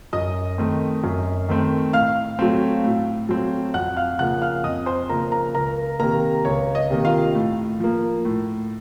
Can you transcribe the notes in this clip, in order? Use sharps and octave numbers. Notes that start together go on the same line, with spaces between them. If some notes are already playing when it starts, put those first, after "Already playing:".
F#2 D#5 D#6
D#3 A3 C4
F#2
D#3 A3 C4
A2 F5 F6
F#3 A3 C4
A2
F#3 A3 C4
F2 F#5 F#6
F5 F6
C#3 F3 A#3 F#5 F#6
F5 F6
F2 D#5 D#6
C5 C6
C#3 F3 A#3 A#4 A#5
A#4 A#5
C#2 A#4 A#5
C3 D#3 A#3 A#4 A#5
C#2 C#5
D#5
C3 D#3 A#3
F4 F5
A2
F3 A#3
A2